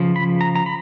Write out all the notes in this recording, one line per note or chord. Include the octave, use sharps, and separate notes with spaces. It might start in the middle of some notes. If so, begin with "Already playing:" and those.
Already playing: C#3 F3
B5
A#5
A#5
B5